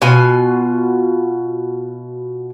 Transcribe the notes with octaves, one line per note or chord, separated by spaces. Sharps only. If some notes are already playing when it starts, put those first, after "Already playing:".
B2 F4 G#5